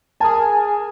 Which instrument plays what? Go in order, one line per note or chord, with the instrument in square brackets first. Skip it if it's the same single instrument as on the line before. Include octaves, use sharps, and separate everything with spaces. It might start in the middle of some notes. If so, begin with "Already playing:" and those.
[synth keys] G#4 A#4 G#5 [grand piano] A5